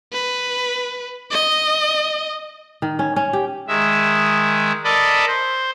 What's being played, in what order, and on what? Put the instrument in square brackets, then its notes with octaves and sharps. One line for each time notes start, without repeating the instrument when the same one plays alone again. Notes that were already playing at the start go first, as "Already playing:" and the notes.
[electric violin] B4
D#5
[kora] D#3
C#4
C#4
G4
[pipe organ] D#3 G#3 E5
A4 A#4 D5 D#5 A5 B5
C5